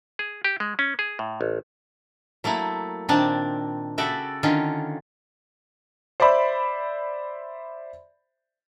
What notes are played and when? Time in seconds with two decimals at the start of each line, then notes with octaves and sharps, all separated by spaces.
0.19 G#4
0.44 G4
0.60 G#3
0.79 C#4
0.99 G#4
1.19 A2
1.41 A1
2.44 F#3 A3 A#3 E4
3.09 A#2 D#3 A#3 C4 D4 A5
3.98 C#3 F#4 A4 D5 E5 G5
4.43 D3 D#3 C#4 F4
6.20 C5 D5 E5 B5